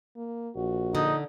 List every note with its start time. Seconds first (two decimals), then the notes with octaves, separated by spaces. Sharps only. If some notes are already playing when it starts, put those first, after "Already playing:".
0.16 A#3
0.56 A#1 F#4
0.95 D3 D#4